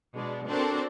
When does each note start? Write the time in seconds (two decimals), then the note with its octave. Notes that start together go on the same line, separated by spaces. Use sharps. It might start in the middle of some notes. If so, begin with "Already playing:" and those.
0.17 B2 G#3 D4
0.49 C4 D4 F#4 A4 A#4 C5